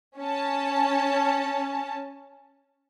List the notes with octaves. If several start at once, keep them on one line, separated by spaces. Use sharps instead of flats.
C#4 A5